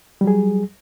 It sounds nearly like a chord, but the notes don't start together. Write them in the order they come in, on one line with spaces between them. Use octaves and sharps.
G3 F#3 G#4